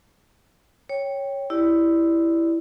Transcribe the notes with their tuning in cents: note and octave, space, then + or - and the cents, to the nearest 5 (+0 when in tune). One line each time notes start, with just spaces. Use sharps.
C#5 +0 G5 +0
E4 +5 G4 +0 D5 +0